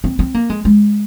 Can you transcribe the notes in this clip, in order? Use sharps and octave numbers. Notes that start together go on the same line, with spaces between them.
C4
C4
A#3
G#3
G#3